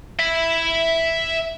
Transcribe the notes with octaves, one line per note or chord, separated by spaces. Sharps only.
E5 B5